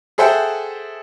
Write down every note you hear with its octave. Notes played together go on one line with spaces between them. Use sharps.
G#4 A4 C5 E5 F#5 G5